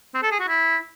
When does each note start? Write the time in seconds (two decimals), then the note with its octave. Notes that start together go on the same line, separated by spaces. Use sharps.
0.14 C4
0.23 A4
0.31 G#4
0.40 F#4
0.48 E4